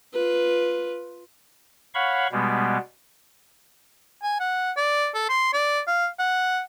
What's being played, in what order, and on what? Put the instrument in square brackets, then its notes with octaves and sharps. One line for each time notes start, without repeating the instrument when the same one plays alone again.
[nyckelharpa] F4 B4
[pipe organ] C#5 F5 F#5 B5 C#6
B2 G3 G#3 B3
[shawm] G#5
F#5
D5
A4
C6
D5
F5
F#5